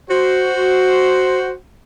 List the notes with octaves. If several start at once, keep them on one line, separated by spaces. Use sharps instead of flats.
F#4 C5